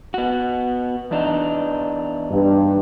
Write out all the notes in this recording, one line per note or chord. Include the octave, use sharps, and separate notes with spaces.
B3 F#4
E2 D4 D#4
G2